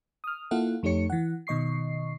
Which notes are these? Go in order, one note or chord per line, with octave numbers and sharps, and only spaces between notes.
D#6 F6
A#3 E4 F4 A4 F5 F#5
F2 A3 D#4 G4 C#5 C#7
E3 F#5
B2 D#3 D#5 C#6 C7